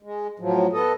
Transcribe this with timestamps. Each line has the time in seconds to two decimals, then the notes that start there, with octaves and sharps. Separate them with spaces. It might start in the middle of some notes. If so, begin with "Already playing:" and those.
0.03 G#3
0.39 A2 F3 F#3
0.73 B3 A4 D#5